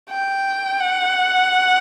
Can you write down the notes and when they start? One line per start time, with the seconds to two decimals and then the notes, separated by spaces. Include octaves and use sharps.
0.10 G5
0.80 F#5